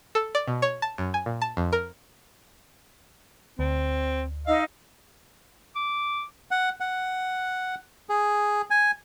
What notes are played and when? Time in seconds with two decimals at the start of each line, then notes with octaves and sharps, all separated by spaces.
0.15 A4
0.35 D5
0.48 B2
0.62 C#5
0.82 A5
0.98 F#2
1.14 G#5
1.26 A#2
1.42 A5
1.57 F2
1.73 A#4
3.59 D2 C4
4.47 D#4 D#5 F5 E6
5.76 D6
6.51 F#5
6.80 F#5
8.09 G#4
8.70 G#5